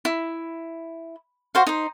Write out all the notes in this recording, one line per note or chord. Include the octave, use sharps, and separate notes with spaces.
E4
F#4 C5 F5
D#4 C5